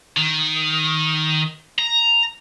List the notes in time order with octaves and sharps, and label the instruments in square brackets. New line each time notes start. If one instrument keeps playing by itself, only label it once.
[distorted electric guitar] D#3
A#5